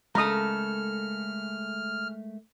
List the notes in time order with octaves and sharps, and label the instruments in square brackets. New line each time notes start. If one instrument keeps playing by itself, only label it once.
[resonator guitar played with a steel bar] C#3 A4 [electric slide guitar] G#3 A3 A#4 [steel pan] A#5 D#6 [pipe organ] F6